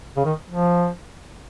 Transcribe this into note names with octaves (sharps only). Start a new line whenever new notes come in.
C#3
D#3
F3